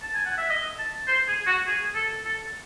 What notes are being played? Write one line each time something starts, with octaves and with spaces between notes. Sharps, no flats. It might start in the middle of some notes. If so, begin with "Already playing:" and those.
A5
G#5
F#5
E5
D#5
A5
C5
G#4
F#4
G#4
A4
A4